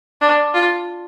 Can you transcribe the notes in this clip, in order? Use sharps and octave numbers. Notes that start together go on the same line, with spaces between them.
D4
F4